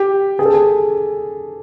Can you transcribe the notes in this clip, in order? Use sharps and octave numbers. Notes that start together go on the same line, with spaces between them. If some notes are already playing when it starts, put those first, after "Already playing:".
Already playing: G4
G#4
A4
G#4